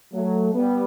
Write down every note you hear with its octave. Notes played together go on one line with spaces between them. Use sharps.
F#3 A3
G3 B3